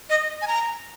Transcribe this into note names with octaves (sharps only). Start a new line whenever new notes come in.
D#5
G#5
A#5